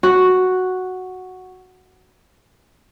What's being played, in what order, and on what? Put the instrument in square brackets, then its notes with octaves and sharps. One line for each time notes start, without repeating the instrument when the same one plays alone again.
[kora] F#4